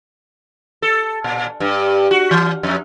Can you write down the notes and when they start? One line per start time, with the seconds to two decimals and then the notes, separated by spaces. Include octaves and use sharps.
0.82 A4
1.24 A#2
1.60 G2
2.11 F#4
2.31 E3
2.63 F2